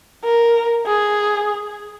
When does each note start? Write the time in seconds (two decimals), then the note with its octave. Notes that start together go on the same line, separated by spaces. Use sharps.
0.25 A#4
0.87 G#4